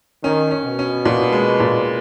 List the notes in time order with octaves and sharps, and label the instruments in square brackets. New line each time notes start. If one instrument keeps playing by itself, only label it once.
[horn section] D#3 [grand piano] C#4
[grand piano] C#4
[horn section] B2
[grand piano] C#4
A#2
G#3
A#2